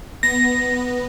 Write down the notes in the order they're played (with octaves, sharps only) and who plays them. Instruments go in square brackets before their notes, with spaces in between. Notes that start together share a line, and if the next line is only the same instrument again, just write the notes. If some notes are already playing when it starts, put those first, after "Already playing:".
[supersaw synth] B3 [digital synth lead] A#6